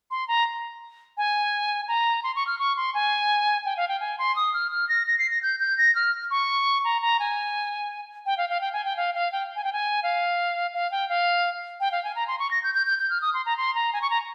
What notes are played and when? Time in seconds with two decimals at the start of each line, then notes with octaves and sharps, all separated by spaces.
0.11 C6
0.28 A#5
1.18 G#5
1.88 A#5
2.23 C6
2.36 C#6
2.47 F6
2.59 C#6
2.77 C6
2.94 G#5
3.65 G5
3.77 F5
3.89 G5
4.00 G#5
4.19 C6
4.36 D#6
4.54 F6
4.71 F6
4.89 A#6
5.07 A#6
5.19 C7
5.31 A#6
5.42 G6
5.60 G6
5.78 A#6
5.95 F6
6.31 C#6
6.84 A#5
7.02 A#5
7.20 G#5
8.26 G5
8.38 F5
8.49 F5
8.61 G5
8.73 G#5
8.85 G5
8.97 F5
9.15 F5
9.32 G5
9.56 G#5
9.64 G5
9.73 G#5
10.03 F5
10.74 F5
10.91 G5
11.09 F5
11.80 G5
11.92 F5
12.04 G#5
12.16 A#5
12.28 C6
12.39 C#6
12.51 A#6
12.63 G6
12.75 G6
12.87 G6
12.99 G6
13.10 F6
13.22 D#6
13.34 C6
13.46 A#5
13.57 C6
13.75 A#5
13.93 G#5
14.02 C#6
14.10 A#5